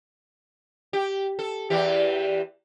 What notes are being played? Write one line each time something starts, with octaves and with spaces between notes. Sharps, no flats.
G4
A4
E2 E3 G4